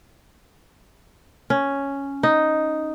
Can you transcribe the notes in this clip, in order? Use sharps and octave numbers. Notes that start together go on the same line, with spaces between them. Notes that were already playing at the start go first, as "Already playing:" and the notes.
C#4
D#4